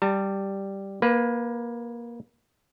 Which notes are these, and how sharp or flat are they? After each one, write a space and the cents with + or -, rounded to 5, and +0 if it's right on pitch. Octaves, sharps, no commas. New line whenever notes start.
G3 +0 A5 +40
A#3 +20 B4 +0